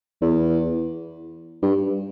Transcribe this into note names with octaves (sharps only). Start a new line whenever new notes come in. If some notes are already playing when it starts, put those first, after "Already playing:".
E2
G2